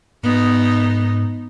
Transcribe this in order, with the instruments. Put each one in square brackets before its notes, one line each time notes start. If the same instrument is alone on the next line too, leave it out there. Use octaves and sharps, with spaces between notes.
[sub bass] G#2 [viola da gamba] B3 D#4